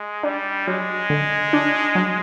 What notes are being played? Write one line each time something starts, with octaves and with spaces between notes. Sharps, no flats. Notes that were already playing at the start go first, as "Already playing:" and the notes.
Already playing: G#3
G3 D4
F#3 G#3
D3
D4
F#3